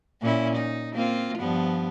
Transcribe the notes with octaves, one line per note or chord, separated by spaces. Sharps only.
A#2 C#4 E4
D#4
A#3 C4 F4
G2 F3 B3